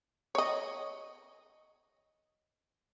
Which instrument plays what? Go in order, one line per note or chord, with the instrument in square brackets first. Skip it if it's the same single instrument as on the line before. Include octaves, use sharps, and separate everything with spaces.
[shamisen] C#5 D#5